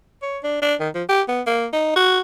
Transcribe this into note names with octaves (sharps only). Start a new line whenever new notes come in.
C#5
D4
D4
D#3
F3
G4
B3
A#3
D#4
F#4